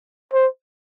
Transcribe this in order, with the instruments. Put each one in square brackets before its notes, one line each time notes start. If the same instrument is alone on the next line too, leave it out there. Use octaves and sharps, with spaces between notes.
[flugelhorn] C5